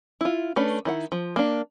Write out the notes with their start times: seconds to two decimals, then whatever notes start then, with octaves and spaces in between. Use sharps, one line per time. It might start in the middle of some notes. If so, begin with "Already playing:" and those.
0.21 E4 F4
0.56 A3 C#4 D4 B4
0.85 D#3 E4 F#5
1.12 F3
1.36 A#3 D4